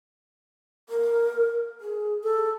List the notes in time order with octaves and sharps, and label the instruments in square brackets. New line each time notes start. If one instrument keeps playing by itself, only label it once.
[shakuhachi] A#4
G#4
[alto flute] A4